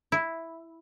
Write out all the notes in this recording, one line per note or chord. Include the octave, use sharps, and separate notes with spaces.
E4